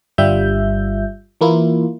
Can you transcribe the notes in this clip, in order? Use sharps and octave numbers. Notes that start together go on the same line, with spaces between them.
G1 G2 G3 F4 E5 G6
E3 A#3 E4 F4